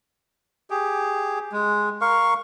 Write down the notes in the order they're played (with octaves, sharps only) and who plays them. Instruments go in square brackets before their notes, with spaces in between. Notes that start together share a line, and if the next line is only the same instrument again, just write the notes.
[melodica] G4 G#4
G#3
A#4 F5 C#6